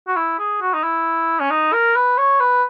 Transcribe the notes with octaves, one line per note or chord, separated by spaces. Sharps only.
F#4
E4
G#4
F#4
D#4
E4
C#4
D#4
A#4
B4
C#5
B4